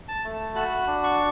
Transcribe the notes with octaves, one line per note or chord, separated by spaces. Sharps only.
A5
A3
F#4 B5
D4
C#6